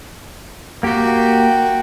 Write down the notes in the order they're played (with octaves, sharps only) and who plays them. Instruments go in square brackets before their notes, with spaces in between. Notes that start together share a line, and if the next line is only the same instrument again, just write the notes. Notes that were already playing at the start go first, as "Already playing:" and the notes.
[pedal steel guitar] A#3 G4 [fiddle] F#4 G5